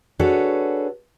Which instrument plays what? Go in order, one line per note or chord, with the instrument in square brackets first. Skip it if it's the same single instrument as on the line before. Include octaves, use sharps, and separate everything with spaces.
[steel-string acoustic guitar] D4 F#4 G#4 A4 B4 C#5